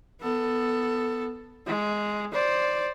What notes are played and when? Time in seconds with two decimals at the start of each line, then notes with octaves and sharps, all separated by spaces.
0.21 B3 A4
1.67 G#3
2.33 C5 D5